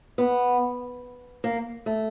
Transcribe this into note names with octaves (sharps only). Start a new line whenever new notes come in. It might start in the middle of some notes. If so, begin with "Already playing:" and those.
B3
A#3
A3